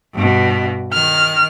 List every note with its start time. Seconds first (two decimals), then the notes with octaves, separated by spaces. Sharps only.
0.15 G2 B2
0.93 D#3 F6